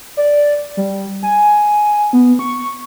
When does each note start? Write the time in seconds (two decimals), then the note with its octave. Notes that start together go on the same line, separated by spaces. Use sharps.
0.17 D5
0.77 G3
1.23 G#5
2.13 B3
2.39 C#6